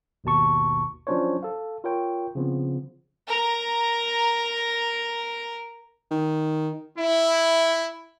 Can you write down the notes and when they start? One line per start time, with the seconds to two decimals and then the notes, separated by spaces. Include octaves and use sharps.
0.24 G#1 D#2 B2 A5 C#6
1.07 F3 F#3 C#4 D4 C5 C#5
1.43 A4 F5
1.84 F4 A#4 C#5 G5
2.35 C#3 F3 B3 C4
3.27 A#4 A#5
6.11 D#3
6.98 E4